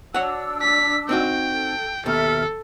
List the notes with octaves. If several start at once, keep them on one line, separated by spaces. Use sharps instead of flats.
D4 F#4 C#5 F#5 E6
B6
C4 D#4 F#4 G5
A4
D#2 B2 A4 E5 F6